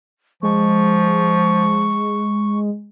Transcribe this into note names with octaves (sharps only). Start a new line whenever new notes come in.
F3 G#3 C#6